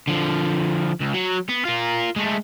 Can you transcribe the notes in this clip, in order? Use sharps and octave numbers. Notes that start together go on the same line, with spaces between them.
D3 F3
C#2
F#3 F#4
B3
F4 A#4
G#3 A3